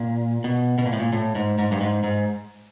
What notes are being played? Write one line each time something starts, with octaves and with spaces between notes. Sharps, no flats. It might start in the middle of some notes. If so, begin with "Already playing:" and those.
Already playing: A#2
B2
B2
A#2
A2
A#2
A2
G#2
G#2
G2
G#2
G#2